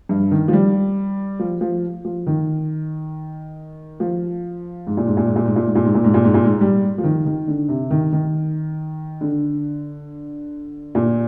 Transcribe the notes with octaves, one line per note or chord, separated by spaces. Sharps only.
G2
D#3
F3
G3
F3
F3
F3
D#3
F3
G#2
A#2
G#2
A#2
G#2
A#2
G#2
A#2
G#2
A#2
G#2
A#2
G#2
A#2
G#2
A#2
G#2
G3
F3
D#3
D#3
D3
C3
D#3
D#3
D3
A#2